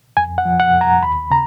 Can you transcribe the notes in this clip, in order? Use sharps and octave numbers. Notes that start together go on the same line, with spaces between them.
F2 G#5
F#5
F3
F#5
F2
A#5
D#2 B5
C#3 A#5